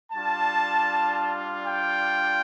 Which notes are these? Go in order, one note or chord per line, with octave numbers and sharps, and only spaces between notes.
G3 D4 F4 A5
G5